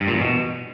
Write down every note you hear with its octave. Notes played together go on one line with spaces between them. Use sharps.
G2
A#2
E2
B2